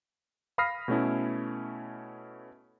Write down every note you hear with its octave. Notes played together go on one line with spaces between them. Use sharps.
F5 B5 D#6 F6 A#6 C7
B2 A3 C#4 E4